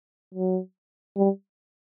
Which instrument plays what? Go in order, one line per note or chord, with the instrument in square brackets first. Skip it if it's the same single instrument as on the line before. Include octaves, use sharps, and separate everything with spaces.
[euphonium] F#3
G3